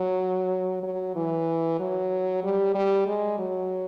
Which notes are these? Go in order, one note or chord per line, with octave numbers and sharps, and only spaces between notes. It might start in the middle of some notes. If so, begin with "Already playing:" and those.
Already playing: F#3
F#3
E3
F#3
G3
G3
G#3
F#3